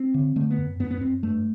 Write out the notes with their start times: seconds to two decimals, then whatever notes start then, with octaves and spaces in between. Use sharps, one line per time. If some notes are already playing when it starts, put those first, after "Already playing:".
Already playing: C4
0.14 D3
0.36 D3 A3
0.50 B3
0.58 F#2
0.80 F#2 B3
0.91 B3
1.01 F#2 C4
1.23 G2 A3